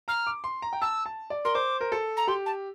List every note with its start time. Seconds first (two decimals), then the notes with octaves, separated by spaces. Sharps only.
0.08 A#5 F6
0.27 D6
0.44 C6
0.62 A#5
0.73 G5
0.81 A5 E6
1.06 A5
1.30 D5
1.44 A#4 C6
1.54 C5 D6
1.81 A#4
1.92 A4
2.16 A#5
2.27 G4 C6
2.46 A5